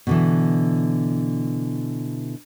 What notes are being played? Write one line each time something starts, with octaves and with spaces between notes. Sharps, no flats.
B2 D3 E3